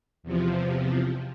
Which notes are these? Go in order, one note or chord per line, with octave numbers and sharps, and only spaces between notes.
E2 C3 F3